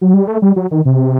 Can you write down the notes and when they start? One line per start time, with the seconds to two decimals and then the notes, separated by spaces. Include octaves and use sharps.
0.01 F#3
0.14 G3
0.27 A3
0.42 G3
0.56 F#3
0.71 D#3
0.85 C3